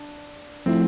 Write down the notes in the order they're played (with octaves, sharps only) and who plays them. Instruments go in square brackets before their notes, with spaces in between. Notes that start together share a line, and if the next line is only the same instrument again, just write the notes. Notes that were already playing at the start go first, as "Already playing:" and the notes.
Already playing: [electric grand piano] D4
[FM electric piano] F3 A3 E4 [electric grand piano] C4